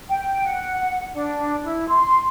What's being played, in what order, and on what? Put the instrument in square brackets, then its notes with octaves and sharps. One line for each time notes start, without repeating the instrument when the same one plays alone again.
[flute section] G5
F#5
D4
E4
C6